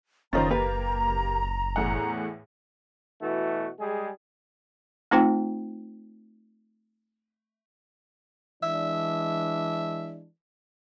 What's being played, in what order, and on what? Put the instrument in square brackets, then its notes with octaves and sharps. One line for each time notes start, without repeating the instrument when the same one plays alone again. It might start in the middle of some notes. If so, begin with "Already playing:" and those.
[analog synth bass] F#1 [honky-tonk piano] D#3 D#5 A6 [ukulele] C#4 F4 C5 [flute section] A#5
[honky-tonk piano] A#3 G4 A#4 [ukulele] B4
[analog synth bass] F#1
[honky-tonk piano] E2 A2 F#5
[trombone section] B2 E3 A3 F#4
G3 G#3 G#4
[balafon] A3 C4 D#4 F4 C5 G5
[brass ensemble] E3 G#3 D4 [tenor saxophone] E5